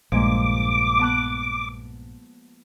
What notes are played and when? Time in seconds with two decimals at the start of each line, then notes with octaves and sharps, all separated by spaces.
0.12 A#1 G2 F3 G#3 A#3 D6
0.99 B3 A5 F#6